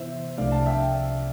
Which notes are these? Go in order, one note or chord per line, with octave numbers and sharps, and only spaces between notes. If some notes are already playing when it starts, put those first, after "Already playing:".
Already playing: C3 E3 B3 E4 C5 E5
C2 C3 F3 A3 D4 D5 F5
F5 A5
E5 G5